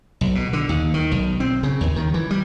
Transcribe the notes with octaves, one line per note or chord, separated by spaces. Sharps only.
B1
B2
D3
D#2
D#3
B1
C4
C#3
D#2
D#3
E3
G3